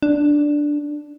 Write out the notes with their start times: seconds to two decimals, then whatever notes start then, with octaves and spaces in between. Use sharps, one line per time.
0.03 D4